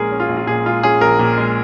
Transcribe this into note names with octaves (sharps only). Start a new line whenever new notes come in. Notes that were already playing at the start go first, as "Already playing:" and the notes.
Already playing: A#1 A#2 G#3 C#4 G#4 A#4
C#4
F4
A#1
F4
A#2 G#4
G#3 F4
C#4 G#4
A#1 A#4
A#2
G#3